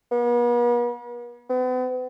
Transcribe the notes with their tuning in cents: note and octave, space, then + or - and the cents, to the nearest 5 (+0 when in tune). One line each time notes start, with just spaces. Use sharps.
B3 -45
B3 +40